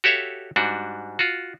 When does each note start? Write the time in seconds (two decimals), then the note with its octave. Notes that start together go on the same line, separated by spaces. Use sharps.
0.04 F#4 G4 A4 C#5 E5 F5
0.56 G#2 G3 D4 F#4
1.19 F4 F#4